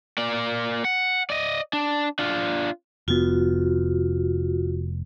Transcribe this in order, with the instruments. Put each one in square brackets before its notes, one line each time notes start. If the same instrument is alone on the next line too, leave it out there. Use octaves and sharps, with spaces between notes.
[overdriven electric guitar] A#3 D5
F#5
D5 D#5
D4
D4 F4
[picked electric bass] F1 B3 [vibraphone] F4 F#4